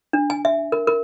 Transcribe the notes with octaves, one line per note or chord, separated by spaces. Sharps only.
D4
G#5
E5
A#4
A#4